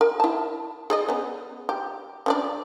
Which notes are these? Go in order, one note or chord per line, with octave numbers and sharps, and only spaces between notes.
A#4
E4 A5
G#4 D5 D#5
B3 C#4
G4
C#4 D4 D5